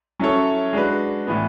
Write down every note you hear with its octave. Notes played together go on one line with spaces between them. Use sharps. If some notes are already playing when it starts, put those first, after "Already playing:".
F#3 C#4 E4 A4 C#5
G#3 D4 F#4 B4
A2 E3 B3